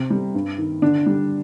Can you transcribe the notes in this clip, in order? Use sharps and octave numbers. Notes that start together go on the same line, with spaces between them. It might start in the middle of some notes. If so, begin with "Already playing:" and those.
Already playing: C3
G3
G2
D#3
D3 D4
G3